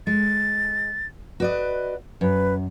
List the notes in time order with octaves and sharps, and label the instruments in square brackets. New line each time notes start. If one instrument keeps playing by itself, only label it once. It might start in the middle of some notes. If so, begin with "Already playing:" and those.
[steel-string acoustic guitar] G#3 [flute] A6
[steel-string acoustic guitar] F#4 D5 D#5 [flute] B4
[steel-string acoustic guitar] F#2 [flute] B4